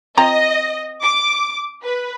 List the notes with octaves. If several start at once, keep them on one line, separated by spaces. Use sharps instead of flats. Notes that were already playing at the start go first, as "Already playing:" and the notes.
C4 F4 D#5 A#5
D6
B4